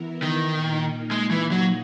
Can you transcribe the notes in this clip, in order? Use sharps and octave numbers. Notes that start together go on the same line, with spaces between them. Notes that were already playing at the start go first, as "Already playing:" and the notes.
Already playing: E3 B3 E4 A#4
D#3
A#2 A#3 D#4
G#3
E3
F#3